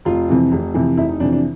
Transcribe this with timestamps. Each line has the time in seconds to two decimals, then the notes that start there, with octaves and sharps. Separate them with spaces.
0.05 F1 F4
0.29 F2 C3 E3
0.52 F1
0.74 F2 C3 E3
0.97 F1 E4
1.09 D#4
1.20 F2 C3 E3 D4
1.32 D4